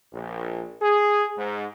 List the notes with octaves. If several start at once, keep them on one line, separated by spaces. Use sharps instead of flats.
A#1
G#4
G#2